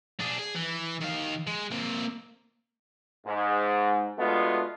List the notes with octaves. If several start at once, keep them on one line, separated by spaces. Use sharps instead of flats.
D4 G#4
G#4
E3
D#3 F5
G#3
A#3 C4
G#2
G#3 A3 B3 D4 F4 F#4